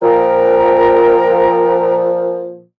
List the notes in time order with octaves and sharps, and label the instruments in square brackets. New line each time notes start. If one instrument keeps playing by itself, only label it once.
[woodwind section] A#2 F3 [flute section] A#4 G5 A#5